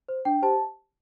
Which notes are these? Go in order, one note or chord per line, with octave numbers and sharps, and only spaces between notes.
C5
D4 G5
G4 C5 A5